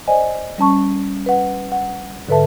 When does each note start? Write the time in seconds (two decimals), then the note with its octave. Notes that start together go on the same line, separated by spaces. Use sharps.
0.08 C5 D5 D#5 G#5
0.58 G3 C#4 A5 C#6
1.26 B4 F#5
1.72 F#5
2.28 G#2 D3 A4 B4 E5 A5